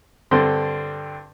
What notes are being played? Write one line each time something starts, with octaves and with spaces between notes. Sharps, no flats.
G2 D3 C4 C6